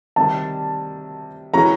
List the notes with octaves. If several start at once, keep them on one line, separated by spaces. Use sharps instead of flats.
C3 D#3 G3 A5
E3 G#3 C#4 F#4 A#5